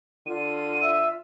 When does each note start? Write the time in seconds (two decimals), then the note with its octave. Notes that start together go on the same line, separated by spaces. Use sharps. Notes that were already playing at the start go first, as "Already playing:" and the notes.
0.27 D3 F4 D#7
0.83 F4 E5 E6